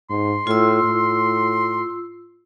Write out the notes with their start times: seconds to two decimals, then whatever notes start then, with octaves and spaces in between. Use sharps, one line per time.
0.10 G#2 C6
0.47 A2 F4 E6
0.84 A2